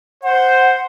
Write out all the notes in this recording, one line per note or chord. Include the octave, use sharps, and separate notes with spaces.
C5 F#5